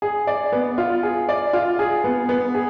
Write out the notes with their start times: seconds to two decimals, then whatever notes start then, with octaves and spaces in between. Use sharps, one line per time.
0.02 G#4
0.27 D5
0.52 B3
0.78 F4
1.03 G#4
1.29 D5
1.53 F4
1.79 G#4
2.04 B3
2.29 B3
2.55 G#4